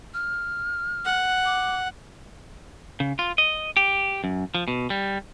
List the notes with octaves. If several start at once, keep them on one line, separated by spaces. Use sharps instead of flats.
F6
F#5
D6
C#3
F4
D#5
G4
F#2
F3
B2
G3